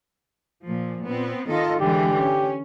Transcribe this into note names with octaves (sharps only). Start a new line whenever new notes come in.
A#2 F3
A#2 B3 C4
D#3 F4 A4 D#5
D3 E3 G#3 G4
C#4